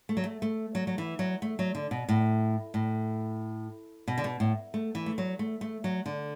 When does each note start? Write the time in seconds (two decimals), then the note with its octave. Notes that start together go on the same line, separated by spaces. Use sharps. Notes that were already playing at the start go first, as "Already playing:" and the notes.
0.09 A3
0.17 F#3
0.24 A3
0.42 A3
0.75 F#3
0.87 F#3
0.98 E3
1.19 F#3
1.42 A3
1.59 F#3
1.75 D3
1.91 B2
2.09 A2
2.74 A2
4.07 B2
4.18 D3
4.24 B2
4.40 A2
4.74 A3
4.95 E3
5.06 A3
5.18 F#3
5.39 A3
5.61 A3
5.84 F#3
6.06 D3